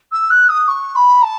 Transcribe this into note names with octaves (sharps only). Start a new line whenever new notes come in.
E6
F#6
D#6
C#6
B5
A5